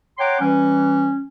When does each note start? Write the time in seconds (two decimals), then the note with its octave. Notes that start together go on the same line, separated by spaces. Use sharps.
0.18 C#5 F#5 G5 A#5 C6 D6
0.41 E3 G3 C#4